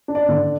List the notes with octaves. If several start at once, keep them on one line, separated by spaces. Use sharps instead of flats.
D4
D5
D3